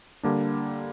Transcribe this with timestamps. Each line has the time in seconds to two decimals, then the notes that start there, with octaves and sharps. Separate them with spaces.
0.23 D3 G3 A#3 D4